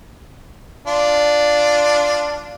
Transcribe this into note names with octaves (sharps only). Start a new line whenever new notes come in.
D4 F4